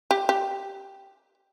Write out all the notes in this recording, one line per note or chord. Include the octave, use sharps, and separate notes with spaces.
G4
G4